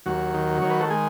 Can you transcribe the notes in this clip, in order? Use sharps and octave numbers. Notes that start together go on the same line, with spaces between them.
D#2 F#3 F#4
D#3
D#3 C#5
B4
A4
G#3 G#4